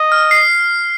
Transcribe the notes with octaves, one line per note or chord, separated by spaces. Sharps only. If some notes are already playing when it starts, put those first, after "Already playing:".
Already playing: D#5
F6
C7